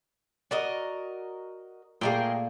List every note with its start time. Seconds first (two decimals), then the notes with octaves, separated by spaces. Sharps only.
0.51 F#4 A#4 D5 D#5
2.01 A#2 A3 A#3 G#4 A#4 G5